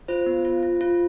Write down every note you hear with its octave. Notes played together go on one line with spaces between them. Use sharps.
F4 C5
B3
F4
F4
F4